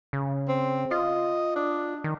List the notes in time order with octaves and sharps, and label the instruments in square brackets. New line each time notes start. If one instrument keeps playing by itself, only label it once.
[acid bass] C#3
[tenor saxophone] C4
[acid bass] F4 [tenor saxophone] D#5
[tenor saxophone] D4
[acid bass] D#3